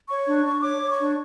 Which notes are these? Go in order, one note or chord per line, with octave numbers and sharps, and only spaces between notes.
C#5 C#6
D4
D4
C#5 D6
C#5
C#6
D4